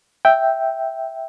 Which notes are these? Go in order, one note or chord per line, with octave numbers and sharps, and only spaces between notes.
E5 G5